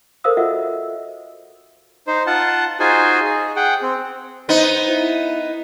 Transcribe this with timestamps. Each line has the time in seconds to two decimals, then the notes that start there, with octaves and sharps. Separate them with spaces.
0.24 A4 A#4 C5 F5 D#6 E6
0.37 F4 F#4 A4 D#5 E5 F#5
2.07 D#4 C5
2.27 F4 F#5 A5
2.80 D#4 F4 F#4 G#4 C5 G#5
3.24 G#4
3.56 G#4 F#5 G5
3.82 C4
4.49 B3 D#4 C5
4.89 E4